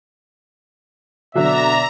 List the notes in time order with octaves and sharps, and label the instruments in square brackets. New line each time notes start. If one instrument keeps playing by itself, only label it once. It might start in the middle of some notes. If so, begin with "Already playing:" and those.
[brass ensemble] B2 D5 E5 [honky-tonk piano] D3 F#3 [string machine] A#5